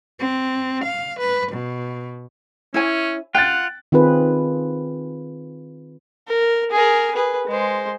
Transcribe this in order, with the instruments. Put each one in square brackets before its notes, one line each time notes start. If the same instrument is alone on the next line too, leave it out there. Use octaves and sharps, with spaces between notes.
[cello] C4
F5
B4
B2
[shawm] C#4 [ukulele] E4 C#5 G#5
[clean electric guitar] F4 [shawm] F#5 [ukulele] G5 [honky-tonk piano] F#6 A6
[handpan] D#3 C4 F4 G#4 B4
[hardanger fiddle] A#4
G#4 A#4
G#4 B4
G#3 C5